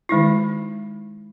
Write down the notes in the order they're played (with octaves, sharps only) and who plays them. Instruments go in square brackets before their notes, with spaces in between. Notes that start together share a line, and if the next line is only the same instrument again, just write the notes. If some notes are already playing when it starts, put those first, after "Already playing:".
[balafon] D#3 G#3 D#4 E4